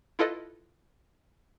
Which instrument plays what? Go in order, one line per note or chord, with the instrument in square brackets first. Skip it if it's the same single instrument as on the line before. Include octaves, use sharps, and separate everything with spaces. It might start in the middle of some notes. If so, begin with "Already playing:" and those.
[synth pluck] E4 F4 A4 B4 D#5